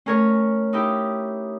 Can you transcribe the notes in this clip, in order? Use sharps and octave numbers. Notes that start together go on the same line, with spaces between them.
A3 C#4 A#4 C#5 G#6
D#4 E4 G4